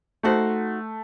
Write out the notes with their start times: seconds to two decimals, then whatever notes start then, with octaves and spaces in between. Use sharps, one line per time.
0.23 A3 D#4 F#4 C5